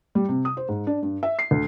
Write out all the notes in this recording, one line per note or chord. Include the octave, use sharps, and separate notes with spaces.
G3
C3
D#6
C5
G#2
D4
G2
E5
C7
D2